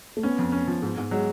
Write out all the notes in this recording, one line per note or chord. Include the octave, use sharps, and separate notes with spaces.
A3
B3 C#4
F2
C#4
F3
G#2
G#2
F#3 G#3